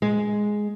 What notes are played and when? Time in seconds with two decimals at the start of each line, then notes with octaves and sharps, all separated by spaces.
0.02 G#3